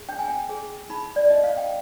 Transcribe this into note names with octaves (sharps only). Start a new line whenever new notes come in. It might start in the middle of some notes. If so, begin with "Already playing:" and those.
Already playing: G#4
D4 G5
G#5
G5
G#4
D#4 B5
D5
D#4 D#5
F5
G5